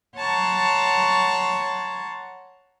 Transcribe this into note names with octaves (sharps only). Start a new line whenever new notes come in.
C#5 F#5 A5 A#5 C6 C#6